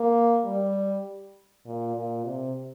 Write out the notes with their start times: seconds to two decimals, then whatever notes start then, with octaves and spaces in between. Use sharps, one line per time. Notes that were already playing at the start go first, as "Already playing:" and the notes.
Already playing: A#3
0.45 G3
1.65 A#2
1.95 A#2
2.24 C3